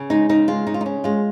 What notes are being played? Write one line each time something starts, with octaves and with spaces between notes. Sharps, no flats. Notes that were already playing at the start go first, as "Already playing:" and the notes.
Already playing: C#3
G#3 D#4
C#3 D#4
G#3 F4
C#3 D#4
F4
D#4
C#4
G#3 F4